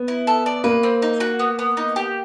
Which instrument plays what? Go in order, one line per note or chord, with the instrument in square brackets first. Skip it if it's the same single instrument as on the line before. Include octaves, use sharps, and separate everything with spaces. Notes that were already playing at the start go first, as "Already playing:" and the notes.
Already playing: [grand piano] B3
[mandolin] E4
A4
D5
[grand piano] A#3 [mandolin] B4
[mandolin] C4
D#4
F#4
B3
B3
D#4
G4